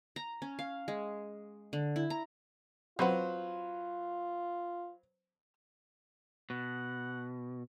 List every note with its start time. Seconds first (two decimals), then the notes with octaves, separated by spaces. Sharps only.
0.16 A#5
0.42 C#4
0.59 F5
0.88 G#3
1.73 D3
1.96 E4
2.10 A#5
2.99 F#3 C4 F4 B4 C5 F#5
6.50 B2 F#5